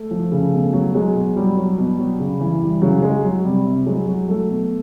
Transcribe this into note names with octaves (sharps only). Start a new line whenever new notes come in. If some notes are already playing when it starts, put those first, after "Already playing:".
Already playing: A3
F3
C#3
B2 A3
F#3
F#3 G#3
B2
F#3 G3
F#3
B2
F#3
C#3
E3
E3 G3
C#3 F#3
F#3 G#3
F#3
C3 G3
C3
F#3 G#3
F#3
F#3 A3
B2